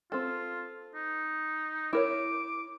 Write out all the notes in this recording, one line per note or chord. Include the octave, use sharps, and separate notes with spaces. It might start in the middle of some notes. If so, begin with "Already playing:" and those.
C4 F4 A4
D#4
E4 A#4 C#5 D6